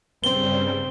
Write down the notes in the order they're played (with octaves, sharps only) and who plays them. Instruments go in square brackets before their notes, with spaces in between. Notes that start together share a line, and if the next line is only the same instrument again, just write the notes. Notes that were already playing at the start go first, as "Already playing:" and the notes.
[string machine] G2 C#3 G3 [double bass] C4 [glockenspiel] G7